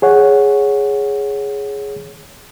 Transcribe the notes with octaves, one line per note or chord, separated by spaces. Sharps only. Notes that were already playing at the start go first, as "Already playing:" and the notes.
G#4 C#5 F#5